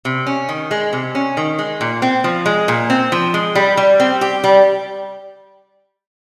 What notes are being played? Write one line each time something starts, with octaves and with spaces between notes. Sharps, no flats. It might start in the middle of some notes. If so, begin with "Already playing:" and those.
C3
C#4
D#3
G#3
C3
C#4
D#3
G#3
A#2
C4
F3
G#3
A#2
C4
F3
G#3
G3
G3
C4
G4
G3